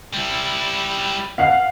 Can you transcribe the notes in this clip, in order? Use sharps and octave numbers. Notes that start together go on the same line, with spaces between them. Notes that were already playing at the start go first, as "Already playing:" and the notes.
G3 E4
F5 F#5 C7